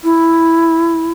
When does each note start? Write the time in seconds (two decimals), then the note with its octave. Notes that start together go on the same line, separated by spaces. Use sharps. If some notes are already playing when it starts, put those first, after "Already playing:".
0.04 E4